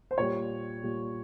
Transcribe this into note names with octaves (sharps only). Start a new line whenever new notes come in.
C5
A#2 G3 C#5
A#2 G3